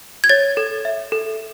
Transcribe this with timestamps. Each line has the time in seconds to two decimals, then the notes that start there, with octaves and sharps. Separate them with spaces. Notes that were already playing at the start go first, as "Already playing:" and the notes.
0.24 G#6
0.29 C#5 A6
0.57 A4
0.85 E5
1.12 A4